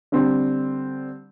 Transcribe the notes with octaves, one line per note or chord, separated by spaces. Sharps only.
D3 G3 C4